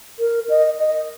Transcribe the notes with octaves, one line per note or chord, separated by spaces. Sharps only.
A#4
D#5
D#5